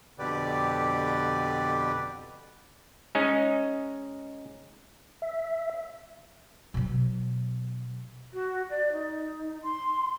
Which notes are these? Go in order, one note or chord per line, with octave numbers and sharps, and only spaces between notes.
F2 B2 D3 G4 B4 D5
G#3 C#4 D#4
E5
B2 F#3
F#4
D5
D#4
C6